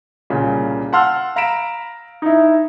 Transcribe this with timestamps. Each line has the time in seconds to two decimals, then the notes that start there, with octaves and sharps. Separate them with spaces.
0.30 C2 A#2 C#3
0.92 F5 F#5 A5 C6 E6 F6
1.36 F5 A#5 B5 B6 D7 E7
2.22 D#4 E4